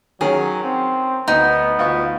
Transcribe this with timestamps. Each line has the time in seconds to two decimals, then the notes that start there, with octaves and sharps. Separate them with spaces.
0.21 D#3 F#3 C#4 G#4
0.64 C4
1.28 D2 B3 D#4
1.79 D2 F4 C#6